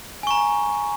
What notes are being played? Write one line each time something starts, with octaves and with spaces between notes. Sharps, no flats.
G#5 A#5 C#6